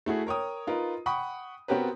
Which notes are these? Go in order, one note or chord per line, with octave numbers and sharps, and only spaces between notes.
A3 E4 F#4 G#4
A#4 C#5 G5 D#6
D#4 F4 A#4 B4
F#5 G5 B5 C#6 D#6
B3 C4 F#4 G4 A#4 B4